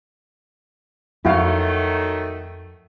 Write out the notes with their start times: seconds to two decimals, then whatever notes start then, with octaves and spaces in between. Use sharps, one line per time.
1.25 F2 D#3 F#3 A3 E4 F#4 F5